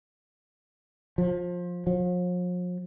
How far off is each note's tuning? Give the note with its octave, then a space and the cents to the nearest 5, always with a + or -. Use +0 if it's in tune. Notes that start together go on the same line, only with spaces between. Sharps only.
F3 +20
F3 +45